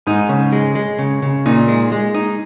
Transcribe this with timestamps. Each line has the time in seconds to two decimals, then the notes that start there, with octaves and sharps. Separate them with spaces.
0.07 G#2 D#4
0.29 C#3
0.52 G#3
0.75 G#3
0.99 C#3
1.22 C#3
1.46 A#2 D#4
1.68 G#3
1.92 G#3
2.15 D#4